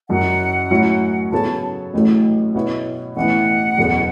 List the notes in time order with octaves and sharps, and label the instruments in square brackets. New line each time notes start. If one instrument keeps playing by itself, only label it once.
[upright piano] F#1 F#2 F#3 [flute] F#5
[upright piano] A2 F#3 C#4 E4
[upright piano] C#3 F#3 B3 A4 C#5 [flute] A5
[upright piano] A1 A2 F#3 A3
B2 B3 E4 C#5
[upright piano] A1 A2 E3 B3 E4 [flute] F#5
[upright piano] F#1 E2 B2 B3 A4